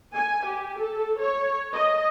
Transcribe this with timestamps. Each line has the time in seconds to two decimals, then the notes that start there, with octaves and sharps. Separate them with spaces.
0.14 G#5
0.44 G4
0.77 A4
1.20 C#5
1.74 D#5